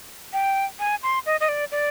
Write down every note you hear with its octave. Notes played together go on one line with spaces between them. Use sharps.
G5
G#5
C6
D#5
D#5
D5
D5